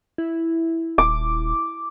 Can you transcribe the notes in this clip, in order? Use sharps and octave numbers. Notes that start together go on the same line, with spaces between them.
E4
D#1 D6